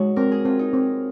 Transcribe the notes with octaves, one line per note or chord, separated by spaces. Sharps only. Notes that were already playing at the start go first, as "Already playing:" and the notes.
Already playing: G#3 D#4 F#4 C#5
C4 A#4
G#4
C4 F4
D#4
C4